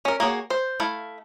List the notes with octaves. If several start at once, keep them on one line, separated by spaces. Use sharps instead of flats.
C#4 A#4
A#3 F#4 G#4 C#5
C5
A3 E4 F5